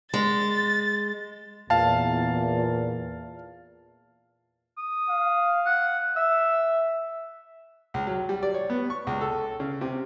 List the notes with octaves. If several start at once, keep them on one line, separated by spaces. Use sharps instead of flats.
G#3 A6
E2 A#2 F5 A5
D#6
F5
F#5
E5 E6
C#2
F#3
G3
D5
C#5
B3
C#6
C#2
A4
C#3
C3